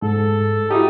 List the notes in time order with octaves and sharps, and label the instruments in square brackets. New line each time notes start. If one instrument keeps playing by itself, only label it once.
[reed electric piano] G#2 [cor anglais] A4
[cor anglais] D#4 [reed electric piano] E4 F#4 G4